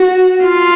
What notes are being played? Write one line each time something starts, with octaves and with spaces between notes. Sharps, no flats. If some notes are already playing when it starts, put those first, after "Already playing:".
Already playing: F#4
F4